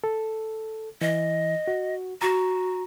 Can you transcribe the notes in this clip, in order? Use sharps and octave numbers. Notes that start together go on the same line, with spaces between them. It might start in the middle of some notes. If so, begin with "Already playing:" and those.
A4
E3 D#5
F#4
F#4 A#5